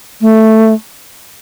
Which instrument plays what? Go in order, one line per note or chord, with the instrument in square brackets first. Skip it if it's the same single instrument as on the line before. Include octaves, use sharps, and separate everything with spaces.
[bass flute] A3